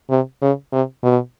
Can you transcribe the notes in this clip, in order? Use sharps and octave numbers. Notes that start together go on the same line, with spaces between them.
C3
C#3
C3
B2